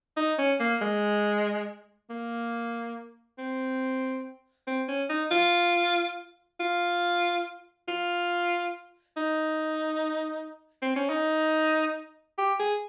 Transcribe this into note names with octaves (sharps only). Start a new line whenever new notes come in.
D#4
C#4
A#3
G#3
A#3
C4
C4
C#4
D#4
F4
F4
F4
D#4
C4
C#4
D#4
G4
G#4